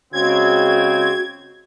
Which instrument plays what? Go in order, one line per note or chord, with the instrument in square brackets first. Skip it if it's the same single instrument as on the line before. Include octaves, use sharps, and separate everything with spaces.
[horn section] C#3 G#3 C4 [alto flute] F#4 [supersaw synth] G#6